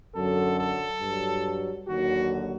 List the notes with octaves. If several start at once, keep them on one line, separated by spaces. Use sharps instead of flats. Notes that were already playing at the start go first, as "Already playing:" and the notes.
F#2 D3 F#3 A4
A4
G2 F#3
D#2 D3 F#3 F#4